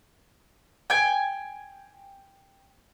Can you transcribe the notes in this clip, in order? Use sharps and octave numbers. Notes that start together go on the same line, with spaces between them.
G5 G#5